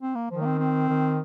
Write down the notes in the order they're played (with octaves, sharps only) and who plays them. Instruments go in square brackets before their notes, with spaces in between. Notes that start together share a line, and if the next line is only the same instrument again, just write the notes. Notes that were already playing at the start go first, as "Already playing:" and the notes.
[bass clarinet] C4
A#3
[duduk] D#3 [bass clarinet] F3
[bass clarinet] A#3
C4
C4
[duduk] D#3